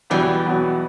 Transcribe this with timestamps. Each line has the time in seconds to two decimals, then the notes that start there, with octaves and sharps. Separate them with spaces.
0.10 E2 B2 E3 F#3 G3
0.46 E2 B2 F#3